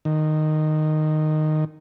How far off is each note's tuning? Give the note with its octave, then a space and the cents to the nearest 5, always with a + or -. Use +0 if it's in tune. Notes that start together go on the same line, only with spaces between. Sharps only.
D#3 -10